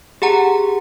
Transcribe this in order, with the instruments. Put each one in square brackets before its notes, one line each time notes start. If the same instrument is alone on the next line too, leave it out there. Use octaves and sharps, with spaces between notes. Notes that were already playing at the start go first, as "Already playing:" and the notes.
[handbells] G4 G#4 F#5 A#5